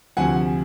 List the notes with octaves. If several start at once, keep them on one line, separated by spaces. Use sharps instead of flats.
D2 C3 F3 F#5 G#5